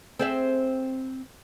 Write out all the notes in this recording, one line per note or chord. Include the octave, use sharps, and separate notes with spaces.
C4 G#4 E5